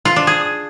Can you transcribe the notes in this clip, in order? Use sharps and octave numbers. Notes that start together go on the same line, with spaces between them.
F4
D4
G#4